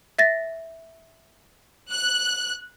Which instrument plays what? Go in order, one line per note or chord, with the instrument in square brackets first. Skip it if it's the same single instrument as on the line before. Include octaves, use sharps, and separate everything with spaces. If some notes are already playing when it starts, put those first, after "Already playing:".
[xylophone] E5 A6 A#6
[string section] F#6